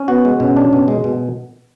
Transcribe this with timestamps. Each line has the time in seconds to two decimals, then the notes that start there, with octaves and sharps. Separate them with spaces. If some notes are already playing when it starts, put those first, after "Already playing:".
Already playing: C#4
0.08 B3 F#4
0.25 G#3
0.40 B2 C#4
0.57 D4
0.73 B2
0.88 G#3
1.04 B2